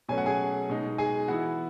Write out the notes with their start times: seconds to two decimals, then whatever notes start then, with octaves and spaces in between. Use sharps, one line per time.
0.08 B2 F#3 A3 C#4 G#5
0.18 F#5
0.26 G#4 G#5
0.69 B2 G#3 D#4
0.98 G#4 G#5
1.28 E3 B3 E4 F#4 F#5